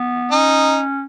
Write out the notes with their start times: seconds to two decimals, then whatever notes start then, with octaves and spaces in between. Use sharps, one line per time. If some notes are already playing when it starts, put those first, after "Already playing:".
Already playing: B3
0.31 C#4 D#4